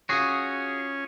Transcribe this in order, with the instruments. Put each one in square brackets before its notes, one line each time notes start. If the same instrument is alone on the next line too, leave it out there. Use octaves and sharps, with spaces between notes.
[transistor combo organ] C#4 [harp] F4 C#6 [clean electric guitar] F#4 G#4